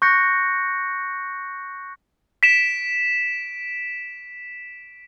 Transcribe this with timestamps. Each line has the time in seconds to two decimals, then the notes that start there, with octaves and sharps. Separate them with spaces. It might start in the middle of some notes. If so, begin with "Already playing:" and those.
0.02 C#6 F#6 G6 A#6 C#7
2.43 B6 D7 E7